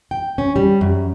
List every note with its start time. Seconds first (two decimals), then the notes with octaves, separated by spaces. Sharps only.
0.11 G5
0.38 C#4
0.56 G3
0.81 F#2